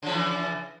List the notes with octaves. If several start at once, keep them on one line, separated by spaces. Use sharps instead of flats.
C#3 E3 F3